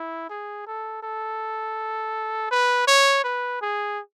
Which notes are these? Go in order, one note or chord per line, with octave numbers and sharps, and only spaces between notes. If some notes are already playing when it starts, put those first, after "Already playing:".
Already playing: E4
G#4
A4
A4
B4
C#5
B4
G#4